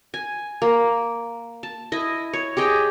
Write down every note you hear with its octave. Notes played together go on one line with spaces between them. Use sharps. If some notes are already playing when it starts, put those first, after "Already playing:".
G#5
A#3
A5
E4 D#5
C#5
G4 G#4 D#5 G5